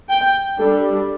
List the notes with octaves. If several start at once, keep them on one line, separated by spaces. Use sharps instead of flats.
G5
G3 D4 A4